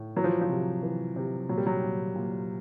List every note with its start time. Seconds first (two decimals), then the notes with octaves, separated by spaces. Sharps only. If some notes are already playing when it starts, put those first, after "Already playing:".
Already playing: A2
0.17 E3 F#3
0.24 F3
0.41 F3
0.49 C3
0.83 E3
1.16 C3
1.49 A#2 F#3
1.58 G3
1.67 F#3
1.83 A#2
2.15 A#2